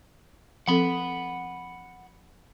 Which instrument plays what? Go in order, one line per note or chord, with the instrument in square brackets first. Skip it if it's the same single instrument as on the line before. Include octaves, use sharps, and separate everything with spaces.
[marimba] F3 C4 A4 [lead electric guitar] F#5 B5